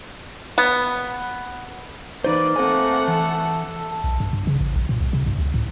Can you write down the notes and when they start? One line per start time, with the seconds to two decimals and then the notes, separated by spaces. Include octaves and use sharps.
0.58 B3
2.25 E3 A#3 D#4 B4 C5 D5
2.56 A3 C4 C5 F#5 G#5
3.08 E3 A4
4.04 B1
4.20 G2
4.33 G2
4.47 C#3
4.60 A1
4.76 A#1
4.89 A#2
5.01 C2
5.13 C3
5.26 G2
5.38 C#2
5.54 A2